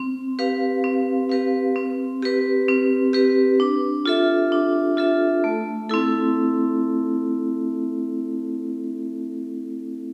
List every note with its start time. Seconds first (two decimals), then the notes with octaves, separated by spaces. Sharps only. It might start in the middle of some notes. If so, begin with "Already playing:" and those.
Already playing: C4
0.39 G4 B4 F5
0.84 C4
1.29 G4 B4 F5
1.76 C4
2.22 G4 B4
2.68 C4
3.13 G4 B4
3.60 D4
4.06 F4 A4 E5
4.52 D4
4.97 F4 A4 E5
5.44 A3
5.89 C4 E4 A4